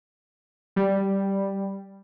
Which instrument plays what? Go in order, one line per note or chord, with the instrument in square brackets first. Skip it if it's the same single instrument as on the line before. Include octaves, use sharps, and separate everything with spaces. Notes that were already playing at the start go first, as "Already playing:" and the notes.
[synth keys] G3